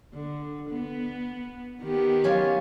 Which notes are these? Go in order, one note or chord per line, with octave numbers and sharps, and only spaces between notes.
D3
B3
D#3 B3 G4
F#3 C#4 F4